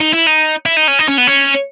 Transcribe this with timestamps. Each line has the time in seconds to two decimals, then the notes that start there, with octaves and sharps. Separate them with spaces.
0.01 D#4
0.14 E4
0.27 D#4
0.66 E4
0.77 D#4
0.88 C#4
0.99 D#4
1.08 C#4
1.18 B3
1.27 C#4